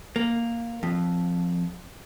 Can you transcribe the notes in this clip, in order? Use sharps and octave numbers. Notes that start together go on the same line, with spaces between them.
A#3
F2